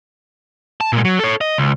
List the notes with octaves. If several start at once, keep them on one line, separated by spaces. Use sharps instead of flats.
A5
A#2 G#3
F#3
A4 C#5
D#5
C#2